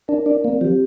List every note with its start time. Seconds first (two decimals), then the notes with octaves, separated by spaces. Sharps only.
0.08 D4 A#4
0.26 D4 D5
0.44 A#3 C4
0.61 F3 G4